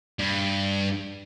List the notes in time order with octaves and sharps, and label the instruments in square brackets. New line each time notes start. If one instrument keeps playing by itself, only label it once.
[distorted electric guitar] G2